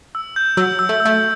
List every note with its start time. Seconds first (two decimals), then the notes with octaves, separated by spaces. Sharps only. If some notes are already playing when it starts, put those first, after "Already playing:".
0.15 E6
0.36 G6
0.57 F#3 E6
0.79 E6
0.89 A3
1.00 E6
1.05 A3